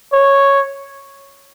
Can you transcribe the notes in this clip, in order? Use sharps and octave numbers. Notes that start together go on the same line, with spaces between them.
C#5